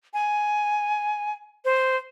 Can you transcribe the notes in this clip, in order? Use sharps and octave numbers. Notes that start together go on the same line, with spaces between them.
G#5
C5